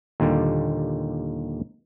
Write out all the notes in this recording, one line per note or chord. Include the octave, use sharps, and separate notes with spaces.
D#2 A#2 D3 G3